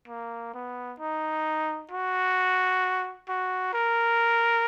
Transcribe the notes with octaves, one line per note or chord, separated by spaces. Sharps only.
A#3
B3
D#4
F#4
F#4
A#4